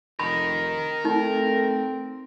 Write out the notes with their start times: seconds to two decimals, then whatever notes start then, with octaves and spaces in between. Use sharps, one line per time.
0.19 F1 A#4 D#5 B5
1.05 A3 C4 D#4